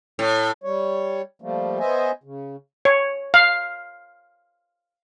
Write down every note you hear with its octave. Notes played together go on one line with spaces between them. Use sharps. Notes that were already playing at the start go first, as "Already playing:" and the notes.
A2
G3 C#5
F3 G3 A3 A#3
B3 C5 D#5 E5 G#5
C#3
C#5
F5